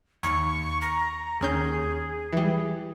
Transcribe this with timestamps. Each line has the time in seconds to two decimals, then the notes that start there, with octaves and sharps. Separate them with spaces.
0.23 D#2 C#6
0.81 A#5
1.41 D#2 C#4 G#4 G6
2.33 E3 G3